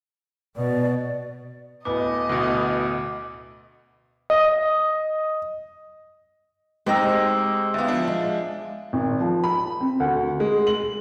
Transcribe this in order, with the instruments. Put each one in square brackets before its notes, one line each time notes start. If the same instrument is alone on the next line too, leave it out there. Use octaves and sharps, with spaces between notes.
[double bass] B2 [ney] D5
[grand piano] D1 B3 [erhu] D#5 [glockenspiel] D6
[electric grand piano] D2 B2
D#5
[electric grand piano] G#2 A#6 [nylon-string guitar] G#3 C4 D#4 [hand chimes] G4 G5 E6
[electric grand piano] D2 B3 [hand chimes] E5 F5
[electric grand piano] F3 D4
[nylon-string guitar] G#3
[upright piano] G#1
F3
B5
C4
D2
G#3
F#7